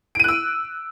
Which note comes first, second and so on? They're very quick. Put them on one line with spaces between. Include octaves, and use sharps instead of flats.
D7 D#7 F#6 E6